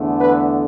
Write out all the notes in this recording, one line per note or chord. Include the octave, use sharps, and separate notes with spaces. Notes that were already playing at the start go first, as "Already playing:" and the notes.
Already playing: E2 D3 A3
B4